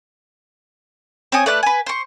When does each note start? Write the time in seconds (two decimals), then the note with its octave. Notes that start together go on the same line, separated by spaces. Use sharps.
1.32 C4 C#5 G#5 D#6
1.46 A3 B4 D5 F#6
1.63 B4 G#5
1.86 C5 C#6